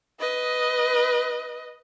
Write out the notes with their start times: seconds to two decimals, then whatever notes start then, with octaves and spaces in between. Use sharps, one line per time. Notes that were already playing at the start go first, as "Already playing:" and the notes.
0.19 B4 D#5